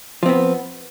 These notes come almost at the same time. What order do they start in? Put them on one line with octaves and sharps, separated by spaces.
F3 C4 B3